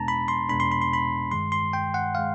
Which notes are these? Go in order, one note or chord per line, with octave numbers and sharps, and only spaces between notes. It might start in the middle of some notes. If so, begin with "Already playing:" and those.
Already playing: E2 B2 G#3 B3 D4 A5 A#5
B5
C6
E2 B2 G#3 B3 D4 B5
C6
B5
C6
B5
G2 D#3 G#3 C6
C6
G5
F#5
D#3 G#3 F5